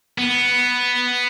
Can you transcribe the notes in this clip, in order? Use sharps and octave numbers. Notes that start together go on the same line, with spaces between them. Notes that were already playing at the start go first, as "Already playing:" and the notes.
B3